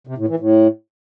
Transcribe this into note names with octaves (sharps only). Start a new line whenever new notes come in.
C3
A2
E3
A2